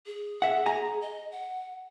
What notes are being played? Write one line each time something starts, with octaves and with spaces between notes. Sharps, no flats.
G#4
E5 F#5
G#5 A#5
D#5
F#5